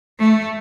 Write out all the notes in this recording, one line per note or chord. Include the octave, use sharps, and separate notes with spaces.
A3